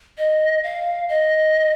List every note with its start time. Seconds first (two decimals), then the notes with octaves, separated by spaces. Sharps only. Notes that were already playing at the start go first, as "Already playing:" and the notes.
0.18 D#5
0.63 F5
1.09 D#5